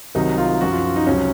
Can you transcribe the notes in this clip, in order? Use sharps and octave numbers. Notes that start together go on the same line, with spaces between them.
C2 C3 D#3 F#3 D#4
F4
F#2 F3 F#4
F4
F4
D#4
C#2 C3 F#3 C#4